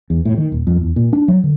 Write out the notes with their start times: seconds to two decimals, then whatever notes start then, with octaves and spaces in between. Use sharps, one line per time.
0.10 E2
0.25 A2
0.37 D#3
0.52 D#1
0.67 F2
0.81 E2
0.96 A#2
1.13 D4
1.28 F#3
1.44 D3